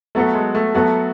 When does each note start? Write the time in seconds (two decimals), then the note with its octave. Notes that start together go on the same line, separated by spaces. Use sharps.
0.15 F#3 A3 B3 F#4 A4
0.34 G#3
0.55 A3
0.74 F#3 A3 B3 F#4 A4